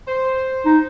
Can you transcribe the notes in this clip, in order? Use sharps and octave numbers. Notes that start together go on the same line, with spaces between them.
C5
D#4